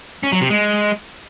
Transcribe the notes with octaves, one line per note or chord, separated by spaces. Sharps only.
C#4
F#3
C3
G#3